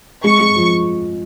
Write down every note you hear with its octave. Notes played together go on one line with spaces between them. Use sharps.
G#3 C#6
G#3
F3